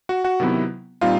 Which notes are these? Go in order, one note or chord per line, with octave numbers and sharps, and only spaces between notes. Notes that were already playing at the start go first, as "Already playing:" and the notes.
F#4 F#5
F#4 F#5
C3 D#3 F#3 B3 E4
A#2 G3 C4 D#4 F4 F5